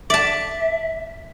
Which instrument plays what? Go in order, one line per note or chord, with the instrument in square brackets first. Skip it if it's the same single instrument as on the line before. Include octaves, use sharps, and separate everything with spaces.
[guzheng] D5 A5 [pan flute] E5